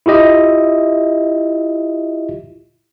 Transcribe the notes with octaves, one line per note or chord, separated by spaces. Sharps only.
E4 F4 G4 D#5 E5